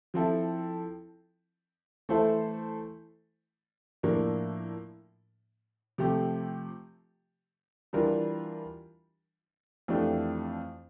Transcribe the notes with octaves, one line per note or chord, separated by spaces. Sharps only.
F3 C4 E4 A4
E3 A3 E4 A4 C5
A2 F3 A#3 D4
C3 F3 A3 C4 G4
E3 G3 D4 F4 A#4
F2 E3 A3 D4 G4